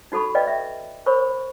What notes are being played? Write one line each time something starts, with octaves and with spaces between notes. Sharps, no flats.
D#4 F#4 A4 B5 C#6
B4 D5 D#5 F5 G5
E5
A#4 C5 C#5 B5 C#6